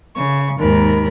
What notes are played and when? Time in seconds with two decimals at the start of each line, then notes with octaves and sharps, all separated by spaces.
0.15 C#3 C#6
0.58 D#2 G#2 A#4 B5